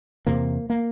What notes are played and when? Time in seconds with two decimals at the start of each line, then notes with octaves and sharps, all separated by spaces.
0.27 E2 C3 A#3
0.70 A#3